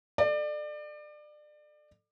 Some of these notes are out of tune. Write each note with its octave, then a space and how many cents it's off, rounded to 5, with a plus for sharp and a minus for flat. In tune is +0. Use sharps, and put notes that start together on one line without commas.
A4 +0 D5 +30